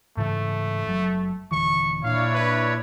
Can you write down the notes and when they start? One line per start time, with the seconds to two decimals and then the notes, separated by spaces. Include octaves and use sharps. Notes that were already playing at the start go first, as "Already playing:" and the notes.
0.17 G#2 C#3 E3 A3
0.85 F#1 F#3
1.51 D#1 D3 E3 C#6
2.03 A#2 D4 E4 C#5 F5
2.34 B4